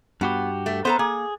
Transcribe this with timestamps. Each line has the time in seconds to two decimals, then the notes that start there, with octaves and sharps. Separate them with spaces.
0.21 G2 B3 F#4 G4
0.66 A3
0.85 B3 A4 C5 A#5
0.99 A#3 G#4